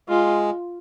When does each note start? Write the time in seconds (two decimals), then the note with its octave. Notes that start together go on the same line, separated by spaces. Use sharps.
0.08 G#3 F4